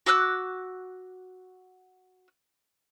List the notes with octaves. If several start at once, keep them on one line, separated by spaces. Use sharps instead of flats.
F#4 D6 E6 F#6